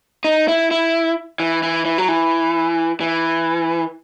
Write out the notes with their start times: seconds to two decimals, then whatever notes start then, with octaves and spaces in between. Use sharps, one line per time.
0.24 D#4
0.48 E4
0.71 E4
1.40 E3
1.63 E3
1.85 E3
1.98 F#3
2.08 E3
3.01 E3